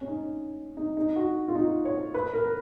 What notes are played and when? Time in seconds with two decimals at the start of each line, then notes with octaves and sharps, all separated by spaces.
0.01 C#4
0.07 D#4
0.77 D#4
0.97 D#4
1.16 F#4
1.48 F4
1.55 D#4
1.85 C#5
2.14 B4
2.33 A#4